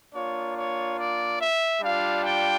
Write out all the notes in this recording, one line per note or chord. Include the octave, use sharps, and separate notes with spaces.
A#3 D4 F4 C#5
C#5
D5
E5
G3 D4 F4 F5
G5